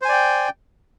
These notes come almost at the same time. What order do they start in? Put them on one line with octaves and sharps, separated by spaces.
C5 G#5 D5 G5